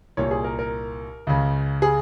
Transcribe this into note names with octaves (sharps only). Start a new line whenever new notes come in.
C2 A#2 C#5
G#4
A#4
A#4
C#2 C#3
G#4